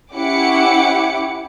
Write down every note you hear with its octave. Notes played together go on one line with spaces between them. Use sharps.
C#4 E4 G4 F#5 D6 C#7